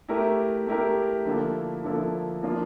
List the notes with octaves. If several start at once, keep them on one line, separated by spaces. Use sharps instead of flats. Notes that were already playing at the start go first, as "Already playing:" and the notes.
A3 E4 G4 A#4
A3 E4 G4 A#4
D3 F3 A#3 E4 A4
D3 F3 A#3 E4 A4
F3 A#3 D4 F4